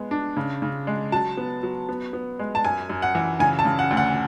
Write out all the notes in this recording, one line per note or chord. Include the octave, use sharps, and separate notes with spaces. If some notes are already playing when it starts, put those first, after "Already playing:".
Already playing: G#3 B3
D4
C#3
C#3
G#3
F#3 A5
B3
F#3
B3
B3
G#3
A5
F#2 G#5
F#2
F#5
E3
C#3 G#5
A5
C#3
F#5
D2
F#5